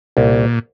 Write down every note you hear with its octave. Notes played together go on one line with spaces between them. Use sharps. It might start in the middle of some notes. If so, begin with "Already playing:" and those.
C2 A#2